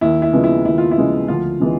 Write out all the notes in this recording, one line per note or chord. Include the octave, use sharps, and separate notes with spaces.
D#2 E4
E4
C#3 F3 G#3 B3
E4
D#2 E4
F4
E4
C#3 F3 G#3 B3
D2 F3 F4
C#3 E3 G#3 B3